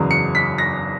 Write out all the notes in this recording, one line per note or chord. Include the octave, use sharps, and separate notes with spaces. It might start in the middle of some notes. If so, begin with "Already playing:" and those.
Already playing: F#1 E2 C#3 F#3
C#7
B6
A#6